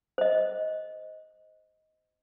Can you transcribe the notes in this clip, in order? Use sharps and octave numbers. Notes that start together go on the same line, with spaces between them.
C5 D#5